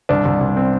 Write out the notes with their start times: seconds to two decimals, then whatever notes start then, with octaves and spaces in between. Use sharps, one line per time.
0.09 C2 D4
0.25 C2
0.41 C2
0.57 C4